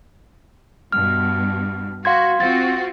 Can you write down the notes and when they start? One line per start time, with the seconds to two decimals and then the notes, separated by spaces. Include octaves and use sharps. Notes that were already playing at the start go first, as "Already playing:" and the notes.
0.92 G2 B2 F6
2.05 F#4 F5 C6 G#6
2.40 C4 F4 F#4 A6